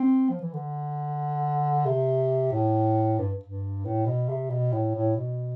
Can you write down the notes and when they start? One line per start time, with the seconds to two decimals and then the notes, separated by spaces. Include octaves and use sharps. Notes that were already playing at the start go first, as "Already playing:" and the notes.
Already playing: C4
0.30 F3
0.41 E3
0.53 D3
1.86 C3
2.52 A2
3.19 G2
3.44 G2
3.85 A2
4.06 B2
4.29 C3
4.50 B2
4.72 A2
4.95 A2
5.17 B2